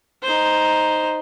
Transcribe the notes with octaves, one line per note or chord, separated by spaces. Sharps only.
D#4 C5